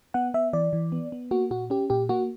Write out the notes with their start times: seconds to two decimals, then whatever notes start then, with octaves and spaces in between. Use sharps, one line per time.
0.14 B3 F#5
0.34 B3 E5
0.53 E3 D5
0.73 E3
0.92 B3
1.12 B3
1.31 A#3 F#4
1.51 A#2 F#4
1.70 C#4 G4
1.90 A#2 G4
2.09 A#3 F#4